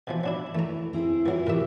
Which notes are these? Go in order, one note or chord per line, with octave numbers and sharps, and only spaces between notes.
B2 E3 F3
F#3 D4 E4
E3 A3 A#5
C4 E4 G#4
E3 F#3 E4 F4 E5
B2 E3 G4 A#4 E5